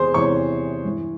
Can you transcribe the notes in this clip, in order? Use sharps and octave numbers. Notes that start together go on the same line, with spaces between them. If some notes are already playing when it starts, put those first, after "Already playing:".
Already playing: E2 C3 E3 G#4 C5 C6
E2 C3 E3 C#5 C#6
G2 E3